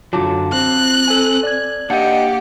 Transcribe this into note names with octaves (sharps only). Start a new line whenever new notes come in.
F#2 D3 F#3 F4 A5 D6
C4 F#6
A4 G#5
D5 G#6
A#3 D4 G4 D#5 F#5 C#7